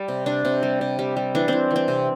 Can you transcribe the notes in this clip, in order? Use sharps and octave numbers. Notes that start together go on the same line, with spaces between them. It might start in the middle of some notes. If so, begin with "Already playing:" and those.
Already playing: G3
C3
C3 D4
C3
G3
C3
G3
G3
E3 D4
E3 C4
E3
C4
C3